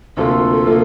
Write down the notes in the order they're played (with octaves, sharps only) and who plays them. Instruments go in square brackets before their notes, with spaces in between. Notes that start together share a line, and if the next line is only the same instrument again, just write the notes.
[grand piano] D2 C3 F3 A#3 F4 [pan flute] A4
[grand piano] C3 F3 A#3 F4